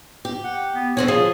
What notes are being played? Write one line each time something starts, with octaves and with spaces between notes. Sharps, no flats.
G4
F#5
B3
D3 C4 C#4 C#5
F3 G#4